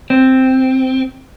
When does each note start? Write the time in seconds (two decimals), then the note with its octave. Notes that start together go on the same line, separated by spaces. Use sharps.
0.10 C4